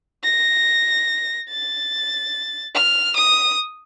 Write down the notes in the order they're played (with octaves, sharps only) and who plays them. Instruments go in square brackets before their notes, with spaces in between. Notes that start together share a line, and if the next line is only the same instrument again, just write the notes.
[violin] A#6
A6
F6
D#6